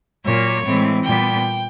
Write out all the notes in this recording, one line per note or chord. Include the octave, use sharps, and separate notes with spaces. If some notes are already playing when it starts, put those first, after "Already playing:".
A#2 F#3 A#3 C#5
A2 E3 G#3 C4
A#2 G3 B3 G5